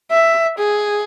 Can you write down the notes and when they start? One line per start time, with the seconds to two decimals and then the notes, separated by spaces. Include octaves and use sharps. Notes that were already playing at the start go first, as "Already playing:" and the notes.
0.12 E5
0.59 G#4